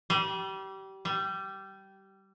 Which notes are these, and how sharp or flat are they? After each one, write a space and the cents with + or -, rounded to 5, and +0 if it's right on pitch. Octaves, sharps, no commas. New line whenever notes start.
G3 -25
G3 -15